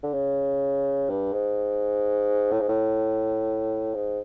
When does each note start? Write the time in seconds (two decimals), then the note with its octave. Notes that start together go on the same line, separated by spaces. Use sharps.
0.03 D3
0.14 C#3
1.09 G2
1.33 G#2
2.51 A2
2.60 G#2
2.69 A2
3.94 G#2